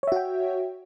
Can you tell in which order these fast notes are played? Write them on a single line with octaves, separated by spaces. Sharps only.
C#5 E5 F#4 G5